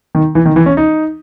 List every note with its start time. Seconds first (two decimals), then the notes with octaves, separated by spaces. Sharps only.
0.15 D#3
0.35 E3
0.45 D#3
0.56 E3
0.66 C#4
0.77 D#4